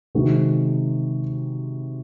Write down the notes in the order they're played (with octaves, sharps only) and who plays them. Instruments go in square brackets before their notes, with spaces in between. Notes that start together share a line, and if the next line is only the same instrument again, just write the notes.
[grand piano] C3 D#3 G#3 C4 F#4